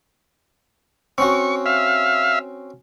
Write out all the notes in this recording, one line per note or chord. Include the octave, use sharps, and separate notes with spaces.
C4 C#4 F#4 C#6
E5 F5